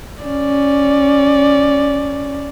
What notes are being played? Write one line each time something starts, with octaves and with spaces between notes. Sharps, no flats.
C#4 D5